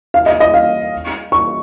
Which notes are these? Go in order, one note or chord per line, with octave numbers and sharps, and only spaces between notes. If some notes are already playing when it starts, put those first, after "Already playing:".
F5
D#5
D#5
F5
C#6